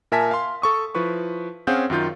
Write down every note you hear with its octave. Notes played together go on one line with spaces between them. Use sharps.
A#2 A#4 E5 G#5 A5 B6
F5 C6
A4 C#6 D#6
F3 E4 B4 C#6
C4 C#4 G#4 F5 F#5 G6
F#2 D#3 F4 G6